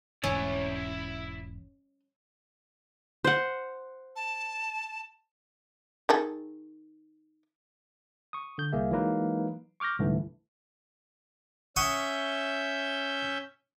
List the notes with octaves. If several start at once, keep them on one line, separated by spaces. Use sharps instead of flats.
E1 G#2 E3 C#4 E4 D5
C5 F#5
A5
D#3 G#4 A4
C#6 D#6
D3 G6
C2 A#3 G#4 E5
E3 F#3 G#3 A#3 D#4 B4
C#6 D6 F6 G6 A#6
C2 G#2 D3 E3 A3
C#4 E5 F#5 C#6 D#6 G6